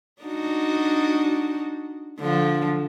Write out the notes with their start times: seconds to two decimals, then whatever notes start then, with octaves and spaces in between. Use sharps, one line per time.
0.22 D4 D#4 F#4
2.20 D3 F3